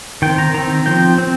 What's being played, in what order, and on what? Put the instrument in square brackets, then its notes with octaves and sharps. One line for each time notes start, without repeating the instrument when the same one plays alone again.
[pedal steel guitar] D#3 C4 G5
A#5
D#3 C4 A#5
F3 C4 G5
C4